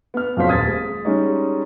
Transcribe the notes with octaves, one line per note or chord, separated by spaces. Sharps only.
B3 F6
F2 F3 F#3 F4 C5 B6
D#1 D#6 F6 G#6 A6 B6
G#3
G3 G#3 C#4 D#4